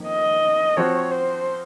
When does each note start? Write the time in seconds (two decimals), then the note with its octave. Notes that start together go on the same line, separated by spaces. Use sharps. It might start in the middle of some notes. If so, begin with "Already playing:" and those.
Already playing: F2 D#3 A#3
0.08 D#5
0.77 F3 C4 F#4 C#5
1.11 C5